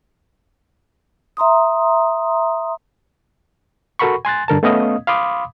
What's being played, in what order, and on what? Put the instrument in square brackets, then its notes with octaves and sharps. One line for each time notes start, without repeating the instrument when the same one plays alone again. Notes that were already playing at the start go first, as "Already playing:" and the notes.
[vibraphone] E5 A#5 C6 D#6
[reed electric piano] F#4 A4 A#4 F#5 B5 C#6
G#5 C6 F#6 A6
G2 D3 A#4 A5
A3 B3 C#4 D#5 F5 D#6
F5 B5 C6 D6 D#6